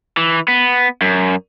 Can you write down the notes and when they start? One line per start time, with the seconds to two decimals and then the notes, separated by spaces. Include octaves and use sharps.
0.17 E3
0.48 B3
1.02 F#2